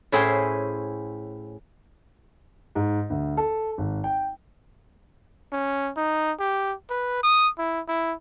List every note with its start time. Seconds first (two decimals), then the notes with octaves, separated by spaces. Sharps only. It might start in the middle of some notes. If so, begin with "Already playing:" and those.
0.12 A2 C#4 E4 G#4 C5
2.75 G#2
3.10 D2
3.37 A4
3.78 G#1
4.04 G5
5.53 C#4
5.97 D#4
6.40 G4
6.90 B4
7.23 D#6
7.59 E4
7.88 E4